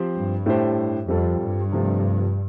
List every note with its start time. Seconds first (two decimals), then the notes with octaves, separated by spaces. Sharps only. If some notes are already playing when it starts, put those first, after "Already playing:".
Already playing: F3 C4 G4 C5
0.14 G2
0.46 A2 A3 D4 G4 C5
1.08 F2 G3 C4 F4 A4
1.41 G2
1.72 C3 F3 A3 F4